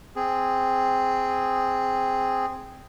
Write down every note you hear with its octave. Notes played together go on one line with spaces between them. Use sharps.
C4 G#4